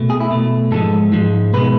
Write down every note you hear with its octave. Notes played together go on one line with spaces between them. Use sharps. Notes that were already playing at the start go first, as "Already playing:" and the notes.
Already playing: B2 A3
G#4
E4
B2 A3
G#2 F3 G#3 A4
G#2 F3 G#3
B2 G#3 B4